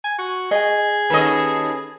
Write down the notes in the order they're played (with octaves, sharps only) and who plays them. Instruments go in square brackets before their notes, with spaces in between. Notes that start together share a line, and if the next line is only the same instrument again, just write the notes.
[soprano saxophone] G#5
F#4
[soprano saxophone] G#4 [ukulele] D#5 G#5
[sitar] D#2 A4 D#5 [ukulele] C#4 B4